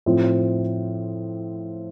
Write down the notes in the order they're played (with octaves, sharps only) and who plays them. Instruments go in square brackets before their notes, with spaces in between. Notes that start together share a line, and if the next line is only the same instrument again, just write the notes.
[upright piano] A2 F3 C4